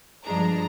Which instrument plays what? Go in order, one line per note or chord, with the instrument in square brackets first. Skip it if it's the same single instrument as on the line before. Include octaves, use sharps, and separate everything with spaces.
[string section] G2 F3 G#3 D4 A#5